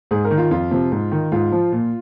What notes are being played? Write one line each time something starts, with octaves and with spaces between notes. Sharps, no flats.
G#2 G#4
A#4
D#3
F4
F2 F4
C3 F3
G#2
D#3
G#2 F4
F3
A#2